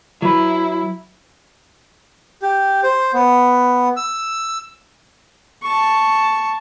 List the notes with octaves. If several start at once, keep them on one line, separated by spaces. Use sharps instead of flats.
F#3 E4 B4
G4
C5
B3
E6
A5 C#6